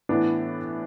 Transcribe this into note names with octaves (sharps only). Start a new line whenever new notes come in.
A2 E3 B3 D4